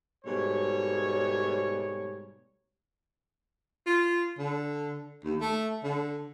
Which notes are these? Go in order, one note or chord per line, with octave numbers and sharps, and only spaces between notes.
G#2 B2 G3 A3 C#5
F4
D3
D#2
A3
D3